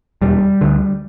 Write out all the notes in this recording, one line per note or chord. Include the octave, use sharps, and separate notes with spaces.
E1 G3
D2 D3